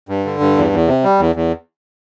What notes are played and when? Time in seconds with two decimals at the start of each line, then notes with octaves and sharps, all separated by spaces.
0.09 G2
0.26 D3
0.40 G2
0.56 E2
0.72 E2
0.88 C3
1.04 G3
1.20 E2
1.35 E2